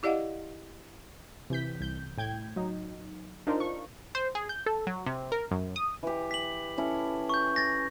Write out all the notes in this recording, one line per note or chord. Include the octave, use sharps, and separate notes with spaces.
E4 G4 D5 D#5 F5 F#5
C3 E3 G6 B6
C2 G6
A2 G5 G6 G#6
F#3 D#4
D4 D#4 F4 A#4 C5
C#6
C5
G#4
G6
A4
F#3
C3
A#4
F#2
D#6
E3 G4
B6 F#7
C#4 E4 A4
C#6 G6
A6 A#6